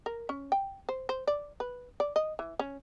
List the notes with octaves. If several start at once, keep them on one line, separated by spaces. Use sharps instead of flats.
A#4
C#4
G5
C5
C5
D5
B4
D5
D#5
E3
C#4